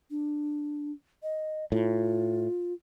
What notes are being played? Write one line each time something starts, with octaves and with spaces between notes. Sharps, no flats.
D4
D#5
A2 F4